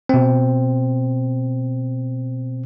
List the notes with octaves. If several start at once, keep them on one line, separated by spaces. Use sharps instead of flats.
B2 C4